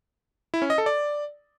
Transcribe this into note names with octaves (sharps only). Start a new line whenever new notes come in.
E4
C#4
D#5
A4
D5